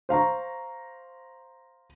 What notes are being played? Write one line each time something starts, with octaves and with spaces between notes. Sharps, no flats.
C5 F5 A#5 C#6